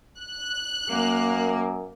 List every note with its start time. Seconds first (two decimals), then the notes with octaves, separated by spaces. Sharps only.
0.20 F#6
0.91 F#2 A#3